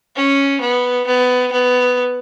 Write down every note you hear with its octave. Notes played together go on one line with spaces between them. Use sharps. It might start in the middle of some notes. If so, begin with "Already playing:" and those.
C#4
B3
B3
B3